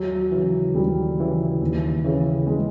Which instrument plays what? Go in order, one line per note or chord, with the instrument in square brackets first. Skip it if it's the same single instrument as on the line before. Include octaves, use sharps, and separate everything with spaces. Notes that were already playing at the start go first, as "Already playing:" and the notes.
Already playing: [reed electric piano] D#2 [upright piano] F#3
[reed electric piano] C#3 E3
[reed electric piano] D#2 [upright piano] G3
[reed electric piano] C#3 E3
D#2
C#3 E3
[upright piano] G#3